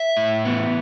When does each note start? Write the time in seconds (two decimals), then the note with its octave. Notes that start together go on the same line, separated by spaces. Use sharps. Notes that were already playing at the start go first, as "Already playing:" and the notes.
Already playing: E5
0.17 A2
0.45 B3